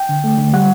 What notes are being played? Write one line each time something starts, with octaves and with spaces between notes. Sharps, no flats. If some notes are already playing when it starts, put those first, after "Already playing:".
Already playing: G5
D3
A3
D3
G3 F#5